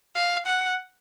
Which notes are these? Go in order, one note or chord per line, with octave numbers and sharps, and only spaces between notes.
F5
F#5